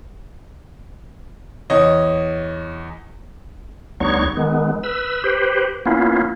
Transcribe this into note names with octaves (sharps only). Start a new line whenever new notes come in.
E2 C#5 D#5
D2 G3 B3 D#4 C#5 C#6
D#3 G#3 B3
B4 E6
G4 B4 C5
A#3 B3 C#4 E4 F4